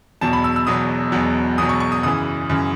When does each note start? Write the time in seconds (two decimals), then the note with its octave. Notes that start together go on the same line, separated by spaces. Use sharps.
0.21 E1 E2 B2 F#3 A5
0.33 B5
0.44 E6
0.56 E6
0.67 E1 E2 B2 F#3 D#6
1.12 E1 E2 B2 F#3
1.58 E1 E2 B2 F#3 D#6
1.69 C#6
1.80 C#6
1.92 D#6
2.03 F#2 C#3 E3 D#6
2.50 F#2 C#3 E3